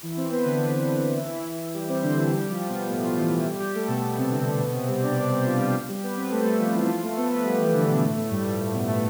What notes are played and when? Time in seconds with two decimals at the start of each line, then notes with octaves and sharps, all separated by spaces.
0.03 E3 E4
0.17 C4 C5
0.31 B3 B4
0.45 D3 D4
1.17 E3 E4
1.74 G3 G4
1.89 C4 C5
2.03 D3 D4
2.17 E3 E4
2.32 G3 G4
2.50 F3 F4
2.69 B2 B3
2.88 A2 A3
3.03 F3 F4
3.17 E3 E4
3.45 G3 G4
3.60 G3 G4
3.74 A3 A4
3.88 B2 B3
4.03 B2 B3
4.18 C3 C4
4.31 D3 D4
4.46 D3 D4
4.60 B2 B3
4.74 C3 C4
4.88 G3 G4
5.02 D4 D5
5.17 C4 C5
5.31 G3 G4
5.45 F3 F4
5.59 G3 G4
5.88 G3 G4
6.03 B3 B4
6.17 C4 C5
6.31 A3 A4
6.45 G3 G4
6.59 F3 F4
6.74 E3 E4
6.88 F3 F4
7.03 A3 A4
7.17 B3 B4
7.31 B3 B4
7.45 G3 G4
7.60 E3 E4
7.74 D3 D4
7.88 B2 B3
8.03 A2 A3
8.17 A2 A3
8.31 G2 G3
8.46 F3
8.59 A2 A3
8.73 B2 B3
8.88 A2 A3